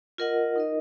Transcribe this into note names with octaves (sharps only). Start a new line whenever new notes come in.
F4 A#4 D#5 F#5
D#4 A#4 D#5